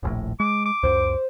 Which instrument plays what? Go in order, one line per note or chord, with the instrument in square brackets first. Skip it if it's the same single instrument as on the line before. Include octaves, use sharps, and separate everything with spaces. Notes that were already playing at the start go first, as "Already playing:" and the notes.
[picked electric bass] D#1 A#1 A2
[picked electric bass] G#3 [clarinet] D6
[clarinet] D6
[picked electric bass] C#2 F#2 [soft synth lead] C5